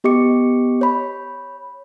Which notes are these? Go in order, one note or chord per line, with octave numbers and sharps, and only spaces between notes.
B3 G4 D#5 D6 C#7
C#5 B5